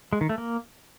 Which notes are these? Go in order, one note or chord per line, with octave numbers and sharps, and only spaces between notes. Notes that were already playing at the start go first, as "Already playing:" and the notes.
G#3
D#3
A3
A#3